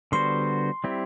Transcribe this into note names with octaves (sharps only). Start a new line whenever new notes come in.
D3 G3 B3 F#4 C5 C6
G3 C4 E4 G4